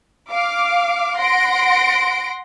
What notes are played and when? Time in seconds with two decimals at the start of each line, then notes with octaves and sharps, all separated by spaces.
0.31 F5 D6
1.20 F#5 C6 A#6 D7